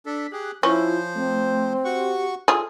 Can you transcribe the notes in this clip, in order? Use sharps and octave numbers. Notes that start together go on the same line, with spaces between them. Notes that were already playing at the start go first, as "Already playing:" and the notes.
D4 A4 B6
G4 G#4 F#6
F3 C#4 E4 F4 C5
A3 C4
F#4 G4 F#5 C#6
F4 G#4 A4